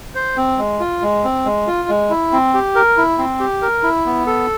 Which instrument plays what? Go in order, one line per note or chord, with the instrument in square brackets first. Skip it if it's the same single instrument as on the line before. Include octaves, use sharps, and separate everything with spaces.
[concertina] C5
C4
G#3
F4
G#3
C4
G#3
F4
G#3
E4
C4
G4
A#4
E4
C4
G4
A#4
E4
B3
A4